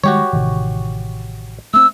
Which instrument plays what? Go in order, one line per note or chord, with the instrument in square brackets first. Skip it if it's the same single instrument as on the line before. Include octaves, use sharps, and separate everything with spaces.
[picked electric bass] D#3 G3 G#3 [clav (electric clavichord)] F#4 G4 C#5
[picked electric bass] A1 C3 D#3
[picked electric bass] A3 C4 [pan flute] E6